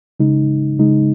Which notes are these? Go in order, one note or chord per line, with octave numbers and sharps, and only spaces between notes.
C#3 G#3 D#4
C#3 G#3 D#4